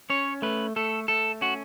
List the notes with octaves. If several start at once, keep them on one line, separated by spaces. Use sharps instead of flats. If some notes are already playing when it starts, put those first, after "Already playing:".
C#4 C#5
A3 B4
A3 A4
A3 A4
C#4 F#4